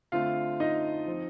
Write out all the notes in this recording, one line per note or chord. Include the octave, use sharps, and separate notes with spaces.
D3 A3 C4 F4 F5
D#4 D#5
F3 C4